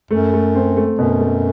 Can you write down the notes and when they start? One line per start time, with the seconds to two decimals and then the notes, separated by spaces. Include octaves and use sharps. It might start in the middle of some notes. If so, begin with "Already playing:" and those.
0.11 F#2 A3
0.34 A3
0.55 C4
0.77 A3
0.99 F#2 B2
1.20 A3